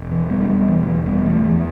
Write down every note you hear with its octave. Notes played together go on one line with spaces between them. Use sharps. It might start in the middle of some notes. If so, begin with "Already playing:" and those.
Already playing: E1
E3
E1 G3 B3
D4
G3 B3
E1 E3
G3
E3
E1 G3 B3
E3 A3
E2 E3